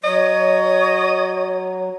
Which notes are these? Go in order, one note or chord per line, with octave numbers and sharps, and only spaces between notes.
F#3 C#5 D#5